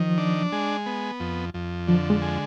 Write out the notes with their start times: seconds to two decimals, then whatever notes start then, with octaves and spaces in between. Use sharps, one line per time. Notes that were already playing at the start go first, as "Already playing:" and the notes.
Already playing: D#3 F3
0.18 D4
0.52 G#3
0.86 B3
1.20 F2
1.54 F2
1.88 D3 F3
2.10 G#3
2.22 G#3